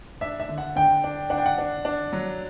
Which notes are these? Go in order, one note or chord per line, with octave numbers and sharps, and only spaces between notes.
D4 E5
E5
D3
F#5
D3 G5
D4
D4 F#5
G5
F#5
D4
D4
F#3